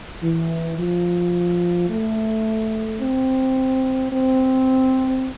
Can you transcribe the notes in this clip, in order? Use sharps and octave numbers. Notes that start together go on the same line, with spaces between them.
E3
F3
A3
C4
C4